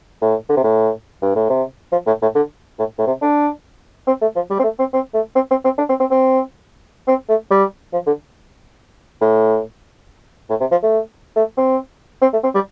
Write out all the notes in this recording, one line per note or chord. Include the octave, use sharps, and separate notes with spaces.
A2
D3
C3
A2
G2
A2
C3
F3
A2
A2
D3
A2
A2
C3
D4
C4
A3
F3
G3
C4
A3
C4
C4
A3
C4
C4
C4
D4
C4
C4
C4
C4
A3
G3
F3
D3
A2
A2
C3
F3
A3
A3
C4
C4
A3
C4
G3